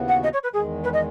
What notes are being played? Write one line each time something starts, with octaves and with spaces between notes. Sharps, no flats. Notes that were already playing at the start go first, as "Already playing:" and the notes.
Already playing: D#2 C#3 E3 B3 F#4
F#5
D#5
C#5
B4
E2 D#3 G#3 G#4
B4
D#5